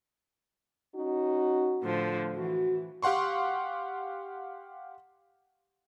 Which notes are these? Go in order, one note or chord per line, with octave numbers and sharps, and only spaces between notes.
C#4 D#4 F#4
A2 D3 F3
E3 F#4
G4 F5 F#5 C6 C#6